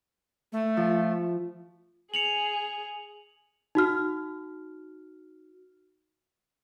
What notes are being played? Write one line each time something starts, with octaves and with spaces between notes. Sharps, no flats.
A3
F3
G#4 C#7 F7 F#7
D#4 F#4 F6